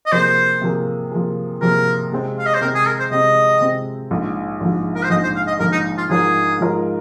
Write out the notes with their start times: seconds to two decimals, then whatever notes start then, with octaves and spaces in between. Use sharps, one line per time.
0.06 D#5
0.12 C3 F3 A#3 G#4 C5
0.62 C3 F3 A#3 G#4
1.11 C3 F3 A#3 G#4
1.61 C3 F3 A#3 G#4 A#4
2.12 C3 G#3 C4
2.39 F5
2.46 D#5
2.54 C5
2.61 C3 G#3 C4 A#4
2.74 G#4
2.86 A#4
2.99 C5
3.11 C3 G#3 C4 D#5
3.61 C3 G#3 C4
4.11 A#1 G#2 F3
4.61 A#1 G#2 F3
4.95 A#4
5.03 C5
5.10 A#1 G#2 F3 D#5
5.23 C5
5.36 F5
5.47 D#5
5.60 A#1 G#2 F3 A#4
5.72 D#4
5.98 F4
6.09 G#2 F3 G#3 F4 G#4 A#4
6.60 G#2 F3 G#3 F4 A#4